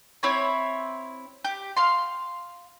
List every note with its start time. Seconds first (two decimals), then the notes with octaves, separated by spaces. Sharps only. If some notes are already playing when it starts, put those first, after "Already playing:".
0.23 C4 E4 C#5
1.45 G4
1.77 F5 C6